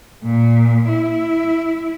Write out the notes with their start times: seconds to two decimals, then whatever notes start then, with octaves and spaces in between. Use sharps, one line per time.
0.24 A#2
0.88 E4